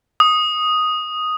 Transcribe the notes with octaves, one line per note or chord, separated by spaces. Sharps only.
D#6